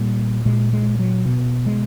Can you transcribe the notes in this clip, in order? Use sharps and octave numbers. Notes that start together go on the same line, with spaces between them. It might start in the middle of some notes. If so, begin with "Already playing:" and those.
Already playing: A#2 G3
A#2 G#3
G#3
F#3
B2
G#3